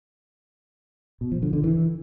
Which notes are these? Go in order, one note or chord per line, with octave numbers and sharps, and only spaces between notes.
B2
F3
D3
D3
E3